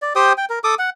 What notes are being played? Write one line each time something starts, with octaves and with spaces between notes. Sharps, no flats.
D5
G4 C5 G5 D#6
G5
A#4
A4 D6 D#6
F#5